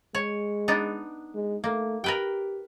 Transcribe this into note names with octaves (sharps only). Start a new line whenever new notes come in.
G#3 C#5
B3 D4 D#4
G#3
A3 A#3
G4 A#4 B4 G5